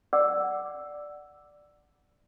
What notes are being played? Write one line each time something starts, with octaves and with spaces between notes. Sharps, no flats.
D5 F#5 D6 E6